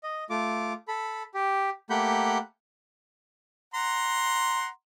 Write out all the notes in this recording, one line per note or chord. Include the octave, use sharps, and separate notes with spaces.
D#5
A3 F4 D6
A4 B5
G4
A3 A#3 G4 F#5 B5 G6
F#5 A#5 C6